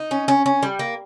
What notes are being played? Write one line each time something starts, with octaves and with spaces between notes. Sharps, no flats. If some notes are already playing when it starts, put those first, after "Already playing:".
Already playing: D#4
C#4
C#4
C#4
G3
A#3